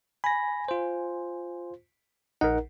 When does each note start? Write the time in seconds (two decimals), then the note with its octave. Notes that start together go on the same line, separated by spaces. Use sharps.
0.24 G#5 B5 A#6
0.68 F4 C5
2.41 A#1 D#4 A#4 F#5